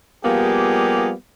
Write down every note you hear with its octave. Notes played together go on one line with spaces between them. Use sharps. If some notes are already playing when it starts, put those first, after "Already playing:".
F3 G3 A#3 B3 G4 G#4